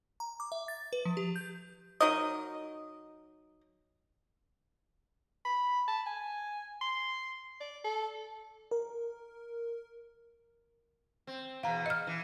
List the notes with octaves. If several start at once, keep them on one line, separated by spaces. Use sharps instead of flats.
A#5
D6
E5
A6
B4
F3
G4
G6
F#3 D#4 A#4 D#5
B5
A5
G#5
C6
D5
A4
A#4
C4
E2 B2 F5 A#5
D#5 F6
E3